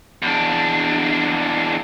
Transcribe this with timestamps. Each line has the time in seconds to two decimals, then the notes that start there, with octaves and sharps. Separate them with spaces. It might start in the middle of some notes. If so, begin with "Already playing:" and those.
0.22 E2 D4